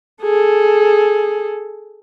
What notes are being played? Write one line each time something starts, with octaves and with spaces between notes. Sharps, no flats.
G#4 A4